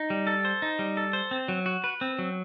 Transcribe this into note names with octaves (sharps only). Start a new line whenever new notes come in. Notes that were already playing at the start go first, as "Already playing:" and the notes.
Already playing: D#4
G3
A4
C5
D#4
G3
A4
C5
C4
F#3
F#4
B4
C4
F#3